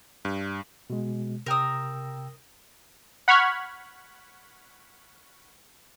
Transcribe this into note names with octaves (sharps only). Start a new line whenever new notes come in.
G2
B2 G#3
C3 A#4 G5 D#6 E6
F#5 B5 C#6 F6 G#6